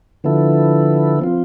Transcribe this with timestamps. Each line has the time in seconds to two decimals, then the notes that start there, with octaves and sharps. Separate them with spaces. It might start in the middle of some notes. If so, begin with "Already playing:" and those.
0.24 D3 F3 B3 E4 A4
1.19 F3 C4 F4